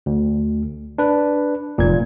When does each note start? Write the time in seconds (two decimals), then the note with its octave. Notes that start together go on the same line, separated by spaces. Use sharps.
0.06 D2
0.98 D4 B4
1.78 F1 A#2 G#6